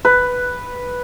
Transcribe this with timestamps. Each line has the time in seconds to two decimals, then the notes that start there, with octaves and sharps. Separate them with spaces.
0.05 B4